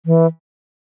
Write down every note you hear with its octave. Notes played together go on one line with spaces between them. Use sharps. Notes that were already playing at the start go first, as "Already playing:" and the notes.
E3